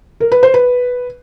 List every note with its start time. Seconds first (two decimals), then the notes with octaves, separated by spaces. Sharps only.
0.20 A#4
0.32 B4
0.43 C5
0.54 B4